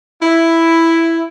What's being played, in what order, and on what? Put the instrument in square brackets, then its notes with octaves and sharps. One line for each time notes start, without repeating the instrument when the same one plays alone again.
[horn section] E4